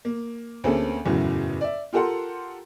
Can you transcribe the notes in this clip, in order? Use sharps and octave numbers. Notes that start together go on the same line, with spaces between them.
A#3
D2 A#3 C4 C#4 G#4 A4
F#1 E2 A2 C#3 F#3
D5 E5
F4 G4 A4 A#4 F#5 C6